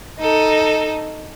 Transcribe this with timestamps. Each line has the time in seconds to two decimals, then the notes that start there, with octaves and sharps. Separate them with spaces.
0.19 D#4 A4